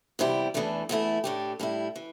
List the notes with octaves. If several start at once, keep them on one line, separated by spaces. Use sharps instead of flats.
E2 C3 G3 E4 G4
E2 E3 A3 D4
E2 E3 A3 E4
A2 A3 D4 G4
A2 G3 E4
E3